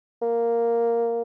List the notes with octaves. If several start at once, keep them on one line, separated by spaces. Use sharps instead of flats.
A#3